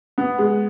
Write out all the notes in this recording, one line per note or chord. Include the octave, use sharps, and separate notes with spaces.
B3
G#3